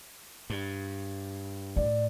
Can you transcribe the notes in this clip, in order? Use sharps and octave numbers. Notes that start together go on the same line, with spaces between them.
G2
A2 D5